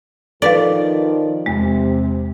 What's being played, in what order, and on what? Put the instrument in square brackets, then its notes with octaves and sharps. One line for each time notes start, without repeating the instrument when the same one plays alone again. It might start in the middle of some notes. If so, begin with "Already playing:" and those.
[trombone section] D#3 F3 [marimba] A4 B4 F5 [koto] D5
[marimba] E2 G#3 [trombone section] C3